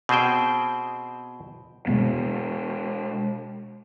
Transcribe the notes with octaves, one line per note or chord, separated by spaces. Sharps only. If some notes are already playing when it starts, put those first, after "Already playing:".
B2 C4 G#4 C5 G5
B2 G#3 B3